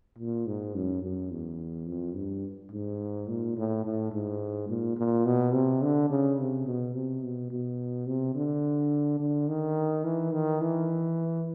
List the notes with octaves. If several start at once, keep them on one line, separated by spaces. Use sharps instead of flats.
A#2
G#2
F#2
F#2
E2
F2
G2
G#2
A#2
A2
A2
G#2
A#2
A#2
B2
C3
D3
C#3
C3
B2
C3
B2
B2
C3
D3
D3
D#3
E3
D#3
E3